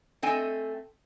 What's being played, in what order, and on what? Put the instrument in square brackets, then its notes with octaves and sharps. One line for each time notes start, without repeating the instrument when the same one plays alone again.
[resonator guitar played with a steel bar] A3 C4 A4 D#5 G5 G#5